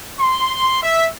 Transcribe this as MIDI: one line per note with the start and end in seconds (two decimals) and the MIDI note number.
0.20 0.78 84
0.83 1.07 76